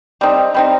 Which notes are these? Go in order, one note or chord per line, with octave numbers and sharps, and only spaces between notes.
G3 C4 D#4
G3 C4 D#4